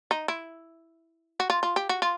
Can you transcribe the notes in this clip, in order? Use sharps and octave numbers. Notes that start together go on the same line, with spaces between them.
D#4
E4
F#4
F4
F4
G4
F#4
F4